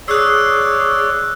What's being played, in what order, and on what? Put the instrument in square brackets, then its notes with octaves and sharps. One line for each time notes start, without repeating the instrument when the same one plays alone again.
[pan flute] G#4 [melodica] C#5 D5 [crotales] E6 F#6